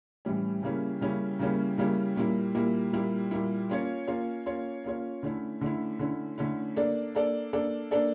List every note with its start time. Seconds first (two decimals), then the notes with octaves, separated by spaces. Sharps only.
0.25 A2 E3 G3 C#4
0.63 C#3 G3 A#3 C#4 E4
1.01 C#3 G3 A#3 C#4 E4
1.39 C#3 G3 A#3 C#4 E4
1.78 C#3 G3 A#3 C#4 E4
2.16 A#2 G3 A#3 E4
2.55 A#2 G3 A#3 E4
2.93 A#2 G3 A#3 E4
3.31 A#2 G3 A#3 E4
3.69 A#3 C#4 F4 C#5
4.08 A#3 C#4 F4 C#5
4.46 A#3 C#4 F4 C#5
4.84 A#3 C#4 F4 C#5
5.23 D3 A3 C#4 E4
5.61 D3 A3 C#4 E4
5.99 D3 A3 C#4 E4
6.38 D3 A3 C#4 E4
6.76 A#3 D4 A4 D5
7.15 A#3 D4 A4 D5
7.53 A#3 D4 A4 D5
7.91 A#3 D4 A4 D5